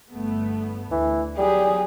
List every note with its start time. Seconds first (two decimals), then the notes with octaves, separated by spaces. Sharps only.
0.10 G1 A3 B3
0.91 D2 E3
1.38 F#3 G3 G4 G#4